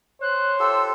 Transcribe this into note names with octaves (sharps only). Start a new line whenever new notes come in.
C5 C#5 F#6
F4 G4 A4 E6